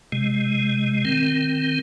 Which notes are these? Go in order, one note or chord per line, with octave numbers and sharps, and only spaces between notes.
C3 G#3
D#3 C4